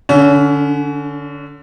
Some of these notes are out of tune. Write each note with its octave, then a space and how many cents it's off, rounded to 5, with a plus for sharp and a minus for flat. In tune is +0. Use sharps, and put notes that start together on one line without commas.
D3 +5 C#4 +35